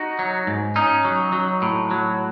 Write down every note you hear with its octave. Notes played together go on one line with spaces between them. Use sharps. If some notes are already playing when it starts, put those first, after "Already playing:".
Already playing: D#4 F#4
F#3
G#2
C#4 D#4
F#3
F#3
A2
F#3